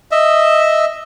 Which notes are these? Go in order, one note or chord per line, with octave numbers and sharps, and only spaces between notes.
D#5 E5